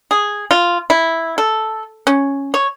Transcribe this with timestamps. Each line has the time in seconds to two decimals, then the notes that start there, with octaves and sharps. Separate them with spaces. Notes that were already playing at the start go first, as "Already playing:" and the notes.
0.11 G#4
0.51 F4
0.90 E4
1.38 A4
2.07 C#4
2.54 C#5